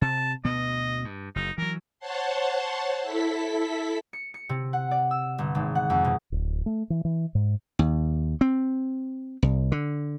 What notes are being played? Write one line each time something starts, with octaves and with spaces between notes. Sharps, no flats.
C3 A5
D2 B2 B3 D#5
G2
F#1 D#4
E3 F#3 A#4
C5 C#5 F#5 A5 C6
E4 A4 B6
C#7
C#7
C3
F#5
D5
E6
G1
G#1
F#5
F2
B2
D1
A3
E3
E3
G#2
D#2
C4
C2
D3